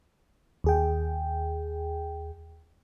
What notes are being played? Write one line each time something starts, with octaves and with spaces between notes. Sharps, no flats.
D#2 G#4 G5